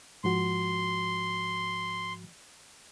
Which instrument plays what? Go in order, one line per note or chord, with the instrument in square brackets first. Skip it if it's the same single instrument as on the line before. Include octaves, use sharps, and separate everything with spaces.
[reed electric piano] G#2 F3 F#4 [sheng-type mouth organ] C6